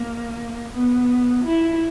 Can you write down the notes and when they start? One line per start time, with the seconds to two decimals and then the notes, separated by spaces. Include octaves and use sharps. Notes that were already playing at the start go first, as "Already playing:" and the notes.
Already playing: A#3
0.72 B3
1.44 E4